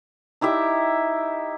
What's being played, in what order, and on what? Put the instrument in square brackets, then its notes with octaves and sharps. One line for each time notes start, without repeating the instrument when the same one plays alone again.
[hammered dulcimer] D#4 E4 G4 E5